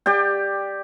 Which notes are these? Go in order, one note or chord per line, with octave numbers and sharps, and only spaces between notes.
G4 D5 G5